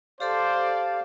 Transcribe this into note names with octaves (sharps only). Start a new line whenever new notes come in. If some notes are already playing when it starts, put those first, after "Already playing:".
G4 A4 C5 D5 F5 A5